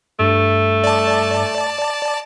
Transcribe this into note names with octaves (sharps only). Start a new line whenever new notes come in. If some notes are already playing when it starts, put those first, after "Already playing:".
G2 A3
D5 A5